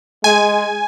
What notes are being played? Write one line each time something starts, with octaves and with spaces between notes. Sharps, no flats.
G#3 G#5